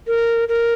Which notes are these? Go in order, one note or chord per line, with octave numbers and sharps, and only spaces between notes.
A#4
A#4